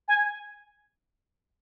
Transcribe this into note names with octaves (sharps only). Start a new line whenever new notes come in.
G#5